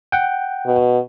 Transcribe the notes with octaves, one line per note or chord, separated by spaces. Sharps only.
F#5 G5
B2